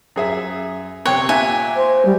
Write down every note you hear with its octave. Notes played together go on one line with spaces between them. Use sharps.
F#2 G#4 E5
C3 C#5 G5 F#6
A#2 E5 G#5 F#6
C5
G3